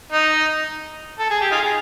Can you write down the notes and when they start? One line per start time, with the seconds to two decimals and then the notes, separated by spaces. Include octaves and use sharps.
0.12 D#4
1.19 A4
1.30 G#4
1.41 G4
1.51 D#4 F4 G#4